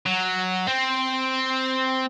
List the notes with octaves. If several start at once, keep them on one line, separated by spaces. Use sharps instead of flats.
F#3
C4